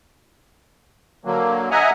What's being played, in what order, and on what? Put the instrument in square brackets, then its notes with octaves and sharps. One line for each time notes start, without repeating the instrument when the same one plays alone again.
[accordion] D3 F#3 A#3
D#5 E5 F#5 G#5 A#5